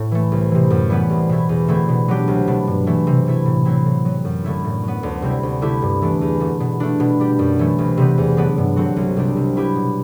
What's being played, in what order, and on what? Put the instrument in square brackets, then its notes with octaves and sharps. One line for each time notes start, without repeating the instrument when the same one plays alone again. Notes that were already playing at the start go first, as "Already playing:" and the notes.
Already playing: [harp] A2
E3 A3
C2
C3 E3
F#2
E3 G3 B3
C2
B2 A3 E4
E2
D3 A3 C4 E4
B2
F#3 B3 D4 G4
C2
B2 A3 D4
G2
E3 A3
C3
E3 A3 E4
A2
F#3 C4 E4
A2
F#3 B3
F#2
D3 A3 E4
A2
F#3 B3
D2
C3 G3 C4 E4
D2
D3 A3 E4 G4
G2
E3 A3 D4
E2
D3 A3
B2
A3 D4
B2
G3 D4 G4
F#2
E3 A3
C2
C3 G3 B3
E2
D3 F#3 B3 D4
G2
D3 F#3 C4 F#4
C2
C3 G3 D4
C3
F#3 B3 E4 G4
B2